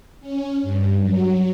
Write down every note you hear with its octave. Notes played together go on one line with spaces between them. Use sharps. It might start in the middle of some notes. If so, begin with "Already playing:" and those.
C#4
G2
F#3